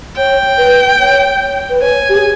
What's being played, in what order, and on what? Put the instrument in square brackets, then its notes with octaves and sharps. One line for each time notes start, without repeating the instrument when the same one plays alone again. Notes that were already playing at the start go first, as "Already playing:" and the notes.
[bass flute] C#5 [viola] G5
[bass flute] B4
C#5
B4
[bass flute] C#5 [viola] G#5
[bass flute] G4
G#4